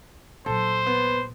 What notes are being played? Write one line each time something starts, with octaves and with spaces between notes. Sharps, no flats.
A#2 F#3 A4 C5
B3